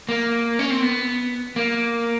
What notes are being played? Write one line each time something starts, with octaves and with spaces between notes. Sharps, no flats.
A#3
C#4
C4
B3
A#3